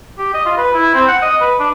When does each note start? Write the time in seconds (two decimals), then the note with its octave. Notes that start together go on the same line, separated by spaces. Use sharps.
0.18 G4
0.34 D#5
0.45 F4
0.58 B4
0.74 E4
0.94 C4
1.08 F#5
1.22 D#5
1.41 B4
1.59 D4